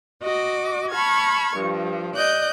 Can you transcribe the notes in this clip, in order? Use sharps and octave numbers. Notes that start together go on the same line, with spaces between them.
F#4 D#5 D6
A5 B5 C#6 F6 G#6
G2 F3
D5 D#5 F#6 G6